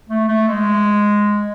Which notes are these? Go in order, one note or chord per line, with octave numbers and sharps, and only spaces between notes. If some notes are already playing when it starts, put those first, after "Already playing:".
A3
A3
G#3